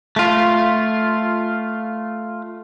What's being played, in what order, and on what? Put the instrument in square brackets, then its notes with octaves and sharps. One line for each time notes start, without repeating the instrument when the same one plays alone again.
[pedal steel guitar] A3 F4